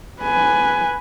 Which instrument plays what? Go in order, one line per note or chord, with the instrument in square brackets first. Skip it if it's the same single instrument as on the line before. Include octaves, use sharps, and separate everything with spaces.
[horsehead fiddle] B4 G#5